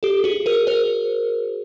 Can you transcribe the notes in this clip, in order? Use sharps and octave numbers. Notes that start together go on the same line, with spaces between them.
G4 A4
F#4 G#4
G#4 A#4
A#4 C5